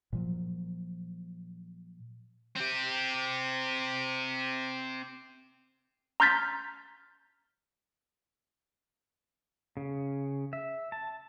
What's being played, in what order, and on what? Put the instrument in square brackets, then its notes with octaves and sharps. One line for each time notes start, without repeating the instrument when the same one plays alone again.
[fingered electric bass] A#2 F3 F#3
[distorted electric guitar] C4 G4
[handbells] A#5 C6 F6 G6 A6 B6
[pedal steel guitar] C#3
E5
A5